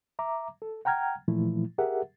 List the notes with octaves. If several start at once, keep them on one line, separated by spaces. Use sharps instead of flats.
E5 A#5 D6
A4
F#5 G5 A#5 F6 G#6
A#2 E3 F3 A3 E4
G4 G#4 A#4 E5 F#5